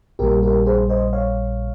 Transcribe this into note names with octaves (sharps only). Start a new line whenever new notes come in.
A#1 A#2 G3 G4 A#4
G4 A#4
G#4 C5
C5 D#5
C#5 F5